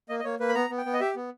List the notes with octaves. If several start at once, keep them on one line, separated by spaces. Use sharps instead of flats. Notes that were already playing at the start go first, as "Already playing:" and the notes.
A#3 D#5
D#5
A#3 C#5
A#3 B4
B5
B3 A#5
B3
G5
B3
D#5
G4 E5
B3